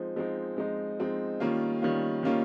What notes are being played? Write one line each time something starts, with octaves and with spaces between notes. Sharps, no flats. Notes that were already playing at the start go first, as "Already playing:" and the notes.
Already playing: F3 G#3 C4 D#4
F3 G#3 C4 D#4
F3 G#3 C4 D#4
F3 G#3 C4 D#4
D#3 G3 A#3 C#4 F4
D#3 G3 A#3 C#4 F4
D#3 G3 A#3 C#4 F4